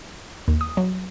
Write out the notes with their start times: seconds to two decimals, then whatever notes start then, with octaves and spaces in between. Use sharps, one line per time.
0.48 D#2
0.61 D#6
0.77 F#3